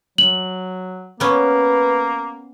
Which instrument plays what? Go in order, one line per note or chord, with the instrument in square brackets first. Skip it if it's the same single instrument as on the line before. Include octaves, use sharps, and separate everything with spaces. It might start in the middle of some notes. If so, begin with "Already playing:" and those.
[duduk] F#3 [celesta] F#7
[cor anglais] A#3 [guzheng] B3 C#4 [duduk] B4